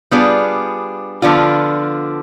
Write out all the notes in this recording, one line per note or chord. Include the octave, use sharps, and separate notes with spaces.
G3 B3 D4 F4 G#4
D3 F3 B3 D4 F4